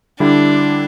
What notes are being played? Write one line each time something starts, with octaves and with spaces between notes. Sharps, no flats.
D3 G3 D4 E4